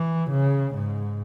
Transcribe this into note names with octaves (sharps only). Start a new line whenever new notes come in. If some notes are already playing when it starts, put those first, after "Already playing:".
Already playing: E3
C#3
G#2